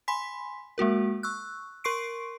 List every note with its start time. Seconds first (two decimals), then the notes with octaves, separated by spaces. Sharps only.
0.08 G#5 B5 C6 B6
0.78 G#3 A#3 F#4 A#4
1.23 C#6 E6 F#6
1.84 A#4 C6 C#6 C7 D7